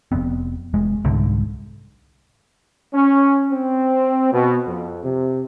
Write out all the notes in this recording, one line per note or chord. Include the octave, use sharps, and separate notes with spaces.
F1 F2 B3 C4
F1 G#3
C2 G#2 D3
C#4
C4
B2
F2
C3